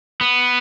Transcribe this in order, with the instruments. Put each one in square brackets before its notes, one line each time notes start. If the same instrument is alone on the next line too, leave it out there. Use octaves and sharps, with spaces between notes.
[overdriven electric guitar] B3